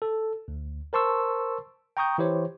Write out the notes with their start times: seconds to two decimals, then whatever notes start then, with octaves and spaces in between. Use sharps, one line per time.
0.02 A4
0.48 D2
0.93 A#4 C5 A5 C6 C#6 E6
1.97 G5 A#5 C#6 D#6 G6
2.18 E3 E4 G4 C5 C#5